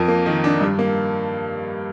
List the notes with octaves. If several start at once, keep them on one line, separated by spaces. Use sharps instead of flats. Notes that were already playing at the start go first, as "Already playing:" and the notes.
Already playing: F2 A#4
A#3
D#3
D4
G2
A#3